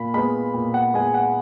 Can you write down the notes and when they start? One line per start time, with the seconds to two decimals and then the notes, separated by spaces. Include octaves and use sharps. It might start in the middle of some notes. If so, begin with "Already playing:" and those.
Already playing: A#2 B5
0.14 G#3 B3 B5
0.54 A#2
0.74 F#5
0.94 G#3 B3 G#5
1.14 F#5